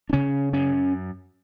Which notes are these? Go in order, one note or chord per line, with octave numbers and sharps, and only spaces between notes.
D4
C#3 C#4
F#2 C#4